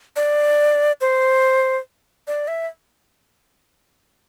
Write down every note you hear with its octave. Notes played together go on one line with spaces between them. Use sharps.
D5
C5
D5
E5